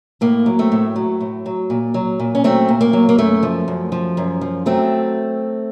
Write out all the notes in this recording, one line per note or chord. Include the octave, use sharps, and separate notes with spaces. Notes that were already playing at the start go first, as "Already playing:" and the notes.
A2 A#3
F#3
A3 C4
A2
F#3
A2
F#3
A#2
F#3
A#2
C#4
F#3 A3 C4
A#2
A#3
F#3
A#3
F#2 A3
F3
F#2
F3
F#2
F3
F#3 A3 C4